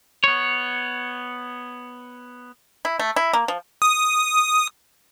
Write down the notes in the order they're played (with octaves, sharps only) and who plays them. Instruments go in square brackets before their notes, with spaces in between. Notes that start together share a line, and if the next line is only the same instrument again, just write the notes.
[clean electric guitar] B3 C#5
[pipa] E4
A3
E4
A#3
F3
[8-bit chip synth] D#6